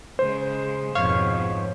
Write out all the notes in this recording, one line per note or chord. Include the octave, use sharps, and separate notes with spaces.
C#3 G#3 C5
F2 G#2 B2 C#5 F5